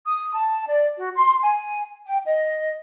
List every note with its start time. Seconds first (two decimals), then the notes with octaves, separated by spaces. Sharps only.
0.06 D#6
0.34 A5
0.68 D5
0.96 F#4
1.16 C6
1.42 G#5
2.06 G5
2.25 D#5